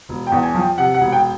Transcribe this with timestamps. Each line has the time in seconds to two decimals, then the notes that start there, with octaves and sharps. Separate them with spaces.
0.09 E1
0.27 E2 G5
0.43 G#5
0.55 F3
0.61 G5
0.78 C3 F#5
0.94 F#5
1.01 E1
1.12 G5